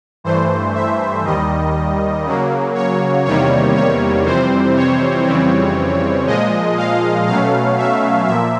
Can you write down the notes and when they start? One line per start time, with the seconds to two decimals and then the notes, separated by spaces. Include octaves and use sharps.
0.24 G2 E3 A3 C5
0.74 E5
1.25 D#2 D#3 G3 D#5
2.25 C#3 F#3 A#3
2.75 C#5
3.25 E2 C3 D#3 G3 A#3 C#5
3.76 C#5
4.25 F2 C3 E3 G3 C4 C5
4.76 C#5
5.26 F2 C#3 E3 G3 C4
6.26 A#2 F3 G#3 D#5
6.77 F5
7.27 B2 F#3 A3 C#4 F5
7.78 E5
8.27 A#2 F3 A#3 E5